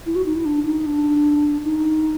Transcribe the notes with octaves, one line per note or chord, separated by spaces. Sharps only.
E4
F#4
D#4
E4
D4
D#4
D4
D#4